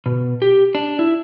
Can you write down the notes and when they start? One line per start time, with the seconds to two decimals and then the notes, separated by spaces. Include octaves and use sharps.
0.06 B2
0.42 G4
0.75 D4
0.99 E4